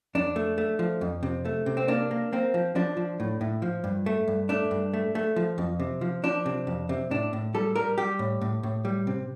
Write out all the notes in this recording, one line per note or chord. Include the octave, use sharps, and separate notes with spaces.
F2 D4
A3
A3
F3
F2
C3
A3
C3
C4
A#3 D4
A#3
A#3 C4
F3
F3 D4
F3
A2
A2
F3
G2
A3
G2
A3 D4
G2
A3
A3
F3
F2
C3
F3
F3 D4
C3
F2
C3
A2 D4
A2
G3 A4
G3 A#4
G3 G4
A2
A2
A2
G3
C3